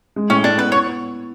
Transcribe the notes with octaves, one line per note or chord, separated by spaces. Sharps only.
G#3
A2 C#4
A2 D4
B3 B4
B3 C#5